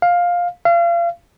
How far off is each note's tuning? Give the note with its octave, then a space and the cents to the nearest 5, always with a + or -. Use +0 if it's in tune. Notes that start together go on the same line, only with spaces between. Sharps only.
F5 +10
F5 -35